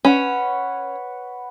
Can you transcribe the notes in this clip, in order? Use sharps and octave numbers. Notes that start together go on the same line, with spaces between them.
C#4 B4 C#5 F#5